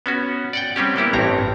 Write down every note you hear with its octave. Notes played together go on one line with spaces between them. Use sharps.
B3 C#4 F#4
D5 F#5 G5
G3 C4 C#4 G4
A#3 B3 E4 G4
A1 G2 C4 C#5 A#5